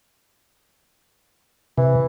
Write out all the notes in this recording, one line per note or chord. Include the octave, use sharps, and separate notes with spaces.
C3 E3